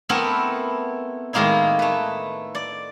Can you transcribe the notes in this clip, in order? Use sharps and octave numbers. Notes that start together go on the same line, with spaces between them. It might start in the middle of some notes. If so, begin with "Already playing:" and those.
A3 B3 C4 E4 A#4
A2 D#3 G#3 A#3 D#4 E4
A3 B4
D5